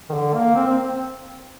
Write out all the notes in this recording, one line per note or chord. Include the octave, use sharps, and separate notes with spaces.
D#3
D3
A#3
C4
C4